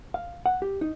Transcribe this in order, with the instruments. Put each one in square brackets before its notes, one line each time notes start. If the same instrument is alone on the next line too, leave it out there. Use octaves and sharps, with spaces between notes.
[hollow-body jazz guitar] F5
F#5
G4
D#4